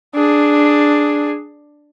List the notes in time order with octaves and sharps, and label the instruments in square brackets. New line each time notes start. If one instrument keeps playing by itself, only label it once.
[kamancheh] D4 G#4